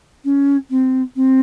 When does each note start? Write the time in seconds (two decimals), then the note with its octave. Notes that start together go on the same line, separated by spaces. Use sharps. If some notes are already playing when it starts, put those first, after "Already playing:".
0.24 C#4
0.70 C4
1.15 C4